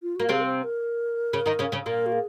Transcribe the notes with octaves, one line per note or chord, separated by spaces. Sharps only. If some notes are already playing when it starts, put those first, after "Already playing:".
F4
A#3 F#4
C3 C4 G#4
A#4
C5
A#4
C#3 C#4
D#3 D#4
C#3 C#4
C#3 C#4
A#2 A#3 A#4
F#4
G#4